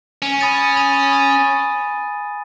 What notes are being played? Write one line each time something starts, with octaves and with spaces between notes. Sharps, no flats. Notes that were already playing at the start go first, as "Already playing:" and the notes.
C#4 G#5
B5 D#6 A6 D#7
G#5
B5 D#6 A6 D#7
G#5
B5 D#6 A6 D#7
G#5